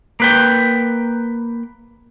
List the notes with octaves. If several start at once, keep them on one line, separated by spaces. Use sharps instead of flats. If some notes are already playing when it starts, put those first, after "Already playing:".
A#3 B4 G5